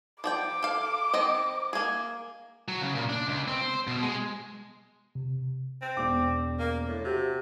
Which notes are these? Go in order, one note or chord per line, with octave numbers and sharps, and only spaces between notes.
F3 D5 G5 D6
A4 F5
D#3 C4 D#5
A#3 G#4
F#3
C#3
A#2
D4
C#2
C4
C5
B2
G#3
C3
C4
E1 D6
A#3
A2
C3 F#4 G4